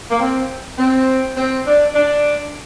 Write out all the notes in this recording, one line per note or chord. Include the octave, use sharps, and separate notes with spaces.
A#3
C4
C4
C4
D4
D4